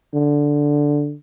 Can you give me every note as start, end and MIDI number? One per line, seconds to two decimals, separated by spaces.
0.14 1.14 50